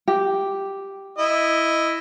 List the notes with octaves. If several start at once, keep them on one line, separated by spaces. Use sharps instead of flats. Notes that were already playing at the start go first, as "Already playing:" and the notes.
G4
E4 D#5